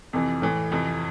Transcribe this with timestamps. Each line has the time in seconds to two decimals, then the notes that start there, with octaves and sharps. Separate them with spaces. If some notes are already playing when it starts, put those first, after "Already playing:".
0.13 F2 C3 E3
0.42 A2 E3
0.71 F2 C3 E3